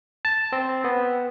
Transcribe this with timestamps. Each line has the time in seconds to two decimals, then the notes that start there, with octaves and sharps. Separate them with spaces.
0.25 A5
0.52 C4
0.84 B3